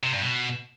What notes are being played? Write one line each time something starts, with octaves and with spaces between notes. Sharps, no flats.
C3
G2
B2